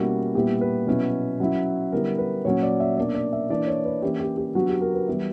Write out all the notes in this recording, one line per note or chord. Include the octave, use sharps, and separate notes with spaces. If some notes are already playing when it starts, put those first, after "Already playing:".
Already playing: B2 G3 A#3 C#4 E4 F#4
A#2 G3 B3 E4 G4
B4
B2 F#3 C#4 E4
F#3 C#4 E4
D3 G3 B3 E4 A#4
B4
A#2 F#3 C#4 C#5
D5
E5
B2 A#3 D4 D5
D5
E5
E3 A#3 D4 D5
C#5
B4
E3 A#3 C#4 E4 G4
G4
G4
F#3 B3 D4 F#4
G4
A#4
B4
E3 G3 B3 E4